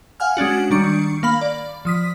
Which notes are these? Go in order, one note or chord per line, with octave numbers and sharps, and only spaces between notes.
F5 F#5 G#5 F6
G#3 C#4 D4 F#4
D#3 G3 D4 C#6 C#7
A#3 F5 B5 F#7
D5
F3 D#6 B6